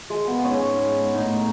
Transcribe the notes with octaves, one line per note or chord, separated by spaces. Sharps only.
G#3
B3
G#2 C#4
A2 D#4